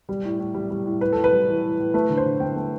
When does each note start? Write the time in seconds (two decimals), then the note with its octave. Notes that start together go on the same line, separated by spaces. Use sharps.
0.09 G3
0.24 A2
0.39 A2
0.54 G3
0.71 G3
0.85 A2
1.01 A2 B4
1.12 A2 A4
1.24 B4
1.32 G3
1.48 E3
1.63 A2
1.78 A2
1.94 A3 B4
2.10 D3
2.17 C5
2.26 D3
2.40 A3 G5
2.56 A3